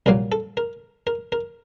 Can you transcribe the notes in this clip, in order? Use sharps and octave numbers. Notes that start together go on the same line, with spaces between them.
C2 A#2 F#3 A#3 A#4
A4
A#4
A#4
A#4